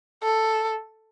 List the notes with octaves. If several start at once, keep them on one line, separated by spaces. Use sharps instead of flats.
A4